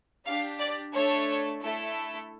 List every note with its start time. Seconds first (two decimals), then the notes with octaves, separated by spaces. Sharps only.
0.25 D4 G4 F5
0.59 D5
0.94 A3 D4 A4 C#5
1.61 A3 E4 A4